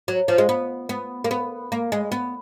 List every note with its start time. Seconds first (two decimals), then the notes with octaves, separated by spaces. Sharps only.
0.08 F#3
0.28 F3
0.38 G#3
0.49 B3
0.89 B3
1.24 A#3
1.31 B3
1.72 A#3
1.92 G#3
2.12 B3